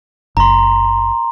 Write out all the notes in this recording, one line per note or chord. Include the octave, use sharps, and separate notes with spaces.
F#1 A#5 C6